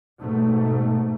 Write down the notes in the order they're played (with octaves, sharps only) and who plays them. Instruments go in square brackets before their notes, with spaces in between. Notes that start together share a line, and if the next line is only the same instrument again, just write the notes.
[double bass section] G#2 B2 A3